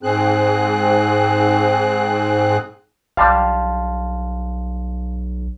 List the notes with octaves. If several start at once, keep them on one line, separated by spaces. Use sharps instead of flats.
G#2 C4 G#4 F#6
B1 G3 D4 F5 A5 C6